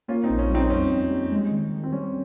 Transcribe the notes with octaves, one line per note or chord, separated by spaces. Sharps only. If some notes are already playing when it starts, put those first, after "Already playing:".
A#3 C#4 F4
C4 D#4
A#1
C#4
G3 C4 D#4
F2 C#4
F2
G3
G#3
D#3
D#3
C4
G3 C#4